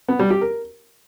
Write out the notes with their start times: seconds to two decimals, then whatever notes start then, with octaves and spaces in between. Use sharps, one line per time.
0.08 B3
0.19 G3
0.30 G4
0.41 A#4